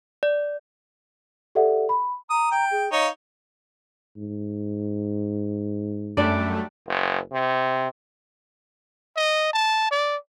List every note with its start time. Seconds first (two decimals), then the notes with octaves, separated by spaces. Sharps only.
0.23 D5
1.55 G4 A4 D5 E5 F#5
1.89 B5
2.30 A#5 D#6
2.52 G5
2.71 G#4
2.92 D#4 C#5 F5
4.17 G#2
6.17 F#2 G3 A3 D4 D5
6.87 F#1
7.32 C3
9.16 D#5
9.53 A5
9.91 D5